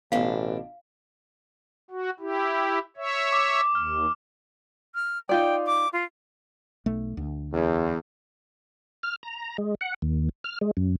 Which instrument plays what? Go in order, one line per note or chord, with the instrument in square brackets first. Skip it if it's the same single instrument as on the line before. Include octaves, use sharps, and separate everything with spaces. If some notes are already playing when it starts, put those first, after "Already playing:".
[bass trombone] A1 [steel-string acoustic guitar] B2 D4 [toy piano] F5
[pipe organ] F#4
E4 G4
C#5 E5
[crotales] D6
[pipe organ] D#2 [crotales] F6
[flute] F6
[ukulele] D#4 F4 D5 [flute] G5
[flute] D6
F4
[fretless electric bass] B1 A3
D2
[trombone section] E2
[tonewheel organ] F6
A#5
G#3
F#5
D#2
F6
G#3
F#2